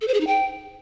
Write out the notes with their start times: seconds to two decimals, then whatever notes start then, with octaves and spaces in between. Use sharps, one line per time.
0.01 A4
0.08 C5
0.14 G#4
0.20 D#4
0.27 G5